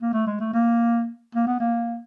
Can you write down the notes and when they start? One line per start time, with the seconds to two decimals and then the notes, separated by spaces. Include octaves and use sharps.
0.02 A#3
0.13 A3
0.27 G#3
0.40 A3
0.53 A#3
1.35 A#3
1.47 B3
1.60 A#3